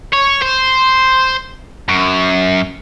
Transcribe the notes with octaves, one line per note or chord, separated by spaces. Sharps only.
C#5
C5
F#2